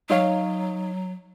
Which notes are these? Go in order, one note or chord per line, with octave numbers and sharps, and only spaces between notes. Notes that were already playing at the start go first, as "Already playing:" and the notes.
F#3 D#4 C#5 F5